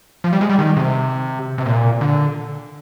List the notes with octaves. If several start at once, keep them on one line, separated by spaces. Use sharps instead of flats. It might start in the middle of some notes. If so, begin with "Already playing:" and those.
F3
G3
G#3
G3
D#3
C3
C3
A#2
D3